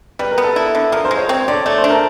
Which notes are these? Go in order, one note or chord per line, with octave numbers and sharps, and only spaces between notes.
G3 B4
A#4
B3
A4
E4
D3
F3 A#4
C5
G#3
C#5
C4 C#5
D3 D5
A3 D5
C5
D4
A#4